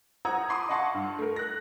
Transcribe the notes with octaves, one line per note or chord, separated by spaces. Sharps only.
C5 F#5 A#5 D#6 E6 G#6
A5 B5 C6 D6 D#6
D#5 F5 F#5 A5 C6 C#6
G2
A3 A#4
F#6 A#6